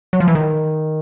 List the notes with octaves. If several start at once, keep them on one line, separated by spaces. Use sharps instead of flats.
F#3
F3
E3
D#3